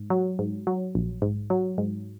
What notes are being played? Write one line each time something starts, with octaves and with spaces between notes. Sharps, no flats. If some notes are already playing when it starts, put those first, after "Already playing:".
Already playing: G#2
F#3
G#2
F#3
A#1
G#2
F#3
G#2